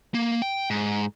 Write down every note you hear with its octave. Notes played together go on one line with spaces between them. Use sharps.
A#3
G5
G#2